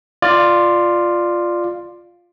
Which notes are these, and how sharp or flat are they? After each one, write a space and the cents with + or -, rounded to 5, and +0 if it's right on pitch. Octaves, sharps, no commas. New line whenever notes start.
F4 +0 D5 +15